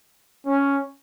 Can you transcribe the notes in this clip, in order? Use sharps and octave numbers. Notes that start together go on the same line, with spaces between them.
C#4